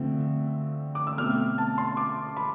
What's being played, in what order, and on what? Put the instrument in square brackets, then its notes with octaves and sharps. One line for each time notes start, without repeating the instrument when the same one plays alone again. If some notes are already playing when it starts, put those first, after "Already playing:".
Already playing: [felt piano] D3 F3 A3 C4
D6
E6
B2 A3 C4 F6
A5
C6
D6
B5